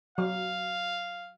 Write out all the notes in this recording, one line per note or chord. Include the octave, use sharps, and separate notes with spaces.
F#3 F5